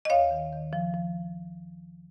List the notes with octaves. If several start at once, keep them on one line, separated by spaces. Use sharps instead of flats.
D#5
D#2 C#5 F5
D#3
D#3
F3
F3